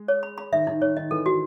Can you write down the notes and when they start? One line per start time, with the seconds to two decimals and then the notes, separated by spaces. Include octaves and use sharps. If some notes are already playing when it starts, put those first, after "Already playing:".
Already playing: G#3
0.08 C#5
0.23 B5
0.38 B5
0.52 D#3 E5
0.67 D#3 D#4
0.81 D#3 C#5
0.97 D#3 D#5
1.11 E3 A4
1.25 D#3 F#4